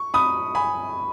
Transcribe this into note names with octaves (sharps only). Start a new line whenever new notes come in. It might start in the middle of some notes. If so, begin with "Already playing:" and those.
Already playing: C#6
B5 D#6
G#5 B5